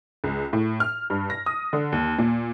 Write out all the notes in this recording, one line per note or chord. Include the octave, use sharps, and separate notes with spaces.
C#2
A2
F6
G2
A#6
D#6
D3
D#2
A#2